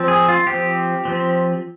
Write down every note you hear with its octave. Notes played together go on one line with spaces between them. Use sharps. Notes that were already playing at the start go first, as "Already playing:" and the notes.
Already playing: F3 C4
G#4
F4
F3 C4 G4
F3 C4